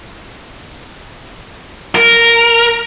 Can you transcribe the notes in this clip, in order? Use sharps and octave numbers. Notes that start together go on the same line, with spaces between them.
A#4